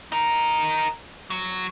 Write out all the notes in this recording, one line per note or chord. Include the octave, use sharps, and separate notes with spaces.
D#4 A#4
F#3